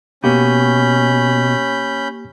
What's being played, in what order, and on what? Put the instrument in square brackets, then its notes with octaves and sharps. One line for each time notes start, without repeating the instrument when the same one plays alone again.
[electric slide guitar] B2 [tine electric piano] A#3 G4 [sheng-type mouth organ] C#4 B5 G6